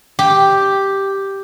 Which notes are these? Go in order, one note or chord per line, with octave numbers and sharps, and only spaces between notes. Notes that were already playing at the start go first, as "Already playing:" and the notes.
G4